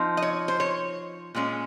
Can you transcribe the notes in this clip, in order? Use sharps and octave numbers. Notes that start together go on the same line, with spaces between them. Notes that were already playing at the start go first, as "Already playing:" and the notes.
Already playing: F3 C4 D#4
D#5
C#5
C5
C#5
A#2 G#3 C#4